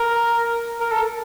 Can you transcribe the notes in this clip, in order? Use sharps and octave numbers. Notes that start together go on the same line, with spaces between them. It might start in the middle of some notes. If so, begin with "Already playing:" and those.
Already playing: A#4
A#4
A4